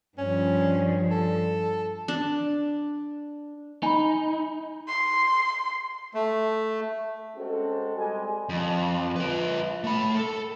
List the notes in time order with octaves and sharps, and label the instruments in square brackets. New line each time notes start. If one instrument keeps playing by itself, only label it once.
[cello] G2 F3 [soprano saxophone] C#4
[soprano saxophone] A4
[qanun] D4
[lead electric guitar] D#4 [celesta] G#5 B5
[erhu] C6
[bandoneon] A3
[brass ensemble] G#3 C4 C#4 F#4 A4
G3 G#3 D#5 G#5
[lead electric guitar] F2
F4 B4
A3 B5
A4